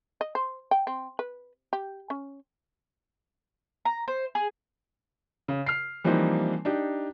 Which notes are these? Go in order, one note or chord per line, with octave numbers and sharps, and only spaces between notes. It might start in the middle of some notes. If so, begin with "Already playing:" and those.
D#5
C5
G5
C4
B4
G4
C#4
A#5
C5
G#4
C#3
F6 C7
E3 F3 G3 A#3 C4 D#4
D4 D#4 G4